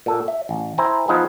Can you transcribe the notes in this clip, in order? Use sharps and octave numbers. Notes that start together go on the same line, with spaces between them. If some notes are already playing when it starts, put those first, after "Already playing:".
A#2 A4
E5
A1
E4 C5 G5 G#5 A#5
F3 B3 D#4 F4 G#4 B4